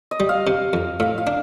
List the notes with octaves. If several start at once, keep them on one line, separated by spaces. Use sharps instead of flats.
D#5
G3
F5
C3
F2
A2 F5
F5
D4